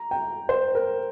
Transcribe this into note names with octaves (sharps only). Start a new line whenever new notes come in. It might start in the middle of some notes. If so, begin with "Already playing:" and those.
Already playing: A#5
G5
C5
A#4